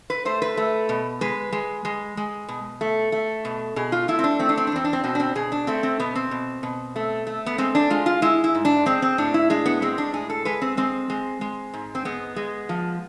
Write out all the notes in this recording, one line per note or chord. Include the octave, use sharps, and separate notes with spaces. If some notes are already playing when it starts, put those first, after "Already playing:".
B4
A3 C5
B4
A3
B2
G#3 B4
G#3
G#3
G#3
B2
A3
A3
B2
B2 G#4
F4
A3 E4
C4
D4
A3 C4
D4
C4
D4
E2 C4
D4
C4
B2 C4
D4
C4
B2 G#4
D4
A3 C4
C4
B2 B3
C4
B2
B2
A3
A3
B3
G#3 C4
D4
G#3 F4
F4
G#3 E4
E4
G#2
D4
G#3 C4
C4
A2 D4
E4
G#3 D4
B3
G#3 C4
D4
A2 G#4
A4
G#3 B4
C4
G#3 C4
G#3
G#3
G#2
C4
G#3 B3
G#3
F3